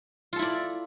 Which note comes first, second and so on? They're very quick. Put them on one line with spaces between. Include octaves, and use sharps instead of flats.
F4 A4 E4 D5